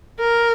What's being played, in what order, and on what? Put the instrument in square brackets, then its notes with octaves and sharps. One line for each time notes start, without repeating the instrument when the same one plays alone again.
[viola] A#4